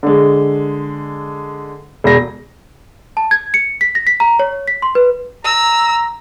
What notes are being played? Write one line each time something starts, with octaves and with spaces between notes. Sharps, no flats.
D3 G#3
E1 A#6
A5
G#6
C#7
B6
A#6
B6
A#5
C#5
B6
C6
B4
A#5 E6